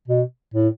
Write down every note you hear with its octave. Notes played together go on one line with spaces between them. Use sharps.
B2
A2